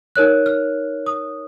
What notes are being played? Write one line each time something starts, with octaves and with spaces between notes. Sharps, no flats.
D#4 A#4 C#5 F#6
F6
D#6